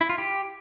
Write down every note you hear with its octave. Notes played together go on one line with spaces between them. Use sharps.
E4
F4
G4